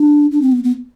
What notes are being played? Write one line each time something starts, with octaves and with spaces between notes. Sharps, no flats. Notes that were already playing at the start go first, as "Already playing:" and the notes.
Already playing: D4
D4
C4
B3
B3